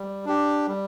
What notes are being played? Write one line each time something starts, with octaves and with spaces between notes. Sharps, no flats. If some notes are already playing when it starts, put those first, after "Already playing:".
Already playing: G3
D4 G4
G3